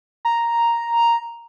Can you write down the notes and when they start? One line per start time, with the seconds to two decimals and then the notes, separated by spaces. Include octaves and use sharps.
0.25 A#5